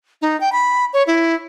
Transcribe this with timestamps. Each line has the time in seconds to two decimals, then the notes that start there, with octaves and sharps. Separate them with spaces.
0.22 D#4
0.41 G5
0.52 B5
0.93 C#5
1.07 E4